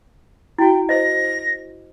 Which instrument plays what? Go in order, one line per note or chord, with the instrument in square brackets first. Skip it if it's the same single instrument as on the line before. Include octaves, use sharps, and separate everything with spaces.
[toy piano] E4 F#4 [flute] G5
[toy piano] C5 D#5 [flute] A#6